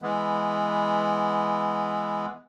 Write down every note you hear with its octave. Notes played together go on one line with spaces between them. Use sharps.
E3 G#3 B3